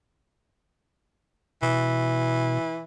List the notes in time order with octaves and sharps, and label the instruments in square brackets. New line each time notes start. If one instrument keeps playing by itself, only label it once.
[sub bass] B2 [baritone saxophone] E3